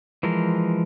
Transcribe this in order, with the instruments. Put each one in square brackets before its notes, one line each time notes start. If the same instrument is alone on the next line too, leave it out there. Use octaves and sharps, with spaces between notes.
[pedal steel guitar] E3 F3 G#3 A#4